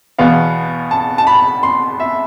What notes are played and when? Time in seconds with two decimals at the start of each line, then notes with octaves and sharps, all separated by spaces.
0.19 E2 B2 B3 F5
0.91 A5
1.18 A5
1.27 B5
1.63 C6
2.00 E5